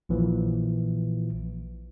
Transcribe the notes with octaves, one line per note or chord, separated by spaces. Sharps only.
A#1 A#2 E3 F3